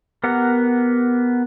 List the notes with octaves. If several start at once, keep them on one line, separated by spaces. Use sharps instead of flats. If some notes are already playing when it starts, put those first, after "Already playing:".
B3 G4 A#4 F#5